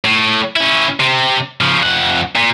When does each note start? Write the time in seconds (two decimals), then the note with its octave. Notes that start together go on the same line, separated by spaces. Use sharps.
0.05 A2
0.56 C#4 E4
1.00 C3 C4
1.61 C#3 F3
1.83 F2 F#5
2.35 A#2